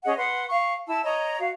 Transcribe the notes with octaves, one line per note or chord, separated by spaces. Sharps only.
C#4 G#4 D#5 F#5
B4 F#5 C6
F5 C#6
E4 A5 E6
C#5 D#5 A#5
F#4 F5